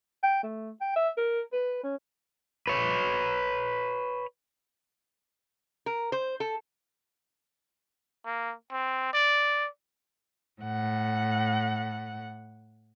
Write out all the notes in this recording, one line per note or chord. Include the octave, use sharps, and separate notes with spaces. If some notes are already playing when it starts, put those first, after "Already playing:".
G5
A3
G5
E5
A#4
B4
C#4
B4 C#5
A#4
C5
A4
A#3
C4
D5
A2 F#5